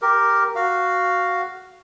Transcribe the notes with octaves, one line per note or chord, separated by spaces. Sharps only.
G4 A#4
F#4 F5